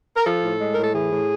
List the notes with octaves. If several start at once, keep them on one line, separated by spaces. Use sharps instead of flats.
A#4
F3 A4
A2
G#3
A2 A#4
A4
E3 G#4
A2